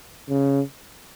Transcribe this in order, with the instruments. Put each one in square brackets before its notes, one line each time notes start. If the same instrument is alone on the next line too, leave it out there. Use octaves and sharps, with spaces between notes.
[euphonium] C#3